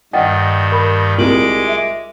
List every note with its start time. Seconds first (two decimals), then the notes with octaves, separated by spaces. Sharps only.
0.13 G2 D#3 D#5 F#5 G5 A6
0.72 A#4 B5
1.18 C2 G#3 F4 A#4 D6 F#7
1.67 E5